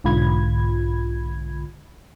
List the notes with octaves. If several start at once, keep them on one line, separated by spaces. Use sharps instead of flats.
B1 G#2 D3 F4 B5 G#6